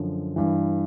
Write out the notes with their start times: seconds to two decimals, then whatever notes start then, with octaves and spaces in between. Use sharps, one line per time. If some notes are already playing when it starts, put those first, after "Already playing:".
Already playing: F#2 D3 F3
0.36 G2 E3